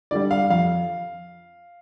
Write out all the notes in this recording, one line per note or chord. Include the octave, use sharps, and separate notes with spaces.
D3 G3 D5
F5
F2 F5